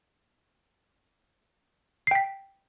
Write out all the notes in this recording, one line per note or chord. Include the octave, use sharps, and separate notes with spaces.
G5 B6 C7